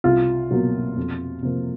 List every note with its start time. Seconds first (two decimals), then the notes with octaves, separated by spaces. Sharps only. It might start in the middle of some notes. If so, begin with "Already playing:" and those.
0.04 C2 F4
0.51 B2 F#3 A#3
0.97 F2
1.43 C3 F3 A#3